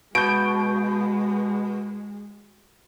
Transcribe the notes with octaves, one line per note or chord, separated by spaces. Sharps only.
B2 G#3 G6 D7